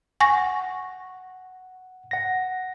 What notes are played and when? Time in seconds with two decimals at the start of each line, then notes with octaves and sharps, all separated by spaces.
0.20 F#5 G#5 C#6 A#6
2.11 F#5 A#6